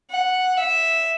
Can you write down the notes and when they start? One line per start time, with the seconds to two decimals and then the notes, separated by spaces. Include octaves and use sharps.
0.10 F#5
0.57 E5